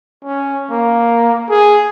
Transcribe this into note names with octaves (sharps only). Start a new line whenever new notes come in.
C#4
A#3
G#4